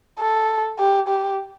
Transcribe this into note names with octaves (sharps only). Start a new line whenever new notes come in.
A4
G4
G4